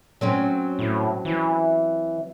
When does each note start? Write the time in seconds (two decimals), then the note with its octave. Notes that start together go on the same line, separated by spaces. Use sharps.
0.21 F#3 C4 C#4
0.79 A2
1.25 E3